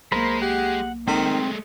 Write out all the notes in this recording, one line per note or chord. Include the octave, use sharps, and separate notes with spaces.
B1 G#3 A#3 A#4 C5 B5
G4 F#5
D#3 G#3 A3 C4